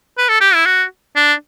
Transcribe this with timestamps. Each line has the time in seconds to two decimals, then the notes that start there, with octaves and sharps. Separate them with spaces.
0.18 B4
0.29 A4
0.41 G4
0.54 E4
0.66 F#4
1.16 D4